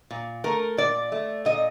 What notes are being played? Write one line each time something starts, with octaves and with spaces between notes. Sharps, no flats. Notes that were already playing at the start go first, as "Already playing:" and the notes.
A#2
A3 A#4
A#2 D5
A3
A#2 D#5